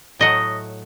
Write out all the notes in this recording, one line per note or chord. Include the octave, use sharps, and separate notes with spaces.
A2 F#3 A3 D#5 F#5